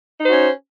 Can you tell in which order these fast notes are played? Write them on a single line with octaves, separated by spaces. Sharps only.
D#4 C5 F#4 C#4